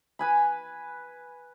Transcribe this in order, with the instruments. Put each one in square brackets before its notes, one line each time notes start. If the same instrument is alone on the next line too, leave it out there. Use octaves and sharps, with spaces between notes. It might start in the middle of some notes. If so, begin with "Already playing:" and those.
[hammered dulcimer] B4 G#5 B5